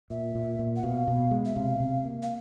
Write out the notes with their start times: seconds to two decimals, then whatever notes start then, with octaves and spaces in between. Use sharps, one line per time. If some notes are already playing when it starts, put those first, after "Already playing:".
0.10 A#2 E5
0.35 A#2
0.59 A#2
0.76 F#5
0.83 B2 F5
1.07 B2
1.31 G#3
1.45 E5
1.56 C3 F5
1.80 C3
2.05 A#3
2.23 F5